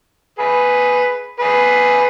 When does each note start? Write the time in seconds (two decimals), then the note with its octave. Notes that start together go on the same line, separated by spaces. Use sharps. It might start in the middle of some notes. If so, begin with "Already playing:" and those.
0.38 G#4 B4
1.40 G#4 B4